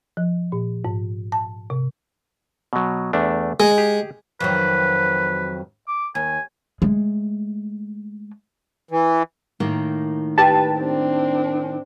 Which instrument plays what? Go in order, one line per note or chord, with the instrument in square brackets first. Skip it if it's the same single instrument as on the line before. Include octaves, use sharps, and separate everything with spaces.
[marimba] F3
A#2
G#2
A5
C3
[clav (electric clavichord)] B2 F#3
E2 A3 D4
[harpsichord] G#3 [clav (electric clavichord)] D#5 G#5
[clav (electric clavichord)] G4 G#4
[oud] F2 D#3 F#3 [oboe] B4
[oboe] D6
[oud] D#2 [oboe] G#5
[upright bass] G#3 A3
[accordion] E3
[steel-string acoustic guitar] A2 D#3 A#3
[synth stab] G4 A5 [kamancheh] B4
[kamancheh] C4 D4